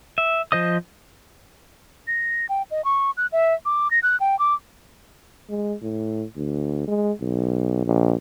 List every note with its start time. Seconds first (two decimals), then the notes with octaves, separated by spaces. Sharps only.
0.18 E5
0.52 F3 C5 D#5 D#6
2.07 A#6
2.49 G5
2.71 D#5
2.85 C#6
3.17 F#6
3.32 E5
3.65 D6
3.91 A#6
4.03 F#6
4.20 G5
4.39 D6
5.49 G#3
5.82 A2
6.36 D2
6.88 G#3
7.21 B1
7.85 A#1